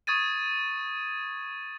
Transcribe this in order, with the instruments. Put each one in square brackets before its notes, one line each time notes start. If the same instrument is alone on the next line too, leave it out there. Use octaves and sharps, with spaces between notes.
[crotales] C#6 D#6 G#6 A6 D#7